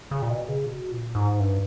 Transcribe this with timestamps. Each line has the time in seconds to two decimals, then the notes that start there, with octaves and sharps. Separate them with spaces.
0.11 C#3
0.22 A#2
0.30 B2
0.48 C#3
0.66 B2
0.91 A#2
1.15 G#2
1.39 G2